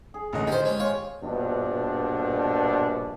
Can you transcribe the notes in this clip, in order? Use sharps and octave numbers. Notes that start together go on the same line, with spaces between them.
G#4
A1 D3 D#5
D#3 G4 C5
G#3 C#4
F4 C#5
A#1 G2 B2 D4